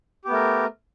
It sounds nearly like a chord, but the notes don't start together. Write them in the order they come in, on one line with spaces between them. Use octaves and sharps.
G4 B3 A3 A#4